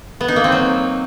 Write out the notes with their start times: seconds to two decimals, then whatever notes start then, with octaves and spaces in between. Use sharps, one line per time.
0.21 B3
0.28 D#4
0.36 A#3
0.44 C4
0.52 F#3